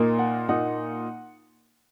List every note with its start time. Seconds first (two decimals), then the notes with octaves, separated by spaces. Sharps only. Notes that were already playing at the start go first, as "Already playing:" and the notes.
Already playing: A#2 A#3 D#4
0.19 F#5
0.49 A#2 A#3 D#4 F#5